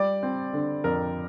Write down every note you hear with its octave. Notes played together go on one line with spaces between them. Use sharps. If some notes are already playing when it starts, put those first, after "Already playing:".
Already playing: G3 D5
C4
D3
F2 A#4